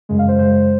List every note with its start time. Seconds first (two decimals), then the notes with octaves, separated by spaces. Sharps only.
0.09 F#2 C#3 G#3
0.19 F5
0.28 C5
0.39 F#2 C#3 G#3 C5